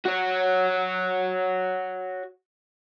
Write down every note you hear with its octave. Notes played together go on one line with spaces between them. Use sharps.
F#4 C#5